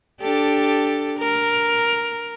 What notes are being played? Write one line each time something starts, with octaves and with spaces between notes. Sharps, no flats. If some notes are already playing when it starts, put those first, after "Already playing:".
D4 G4 A4
A#4